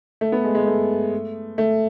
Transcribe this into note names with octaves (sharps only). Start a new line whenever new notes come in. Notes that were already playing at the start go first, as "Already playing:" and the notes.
A3
B3
G#3
G#3
A3
A3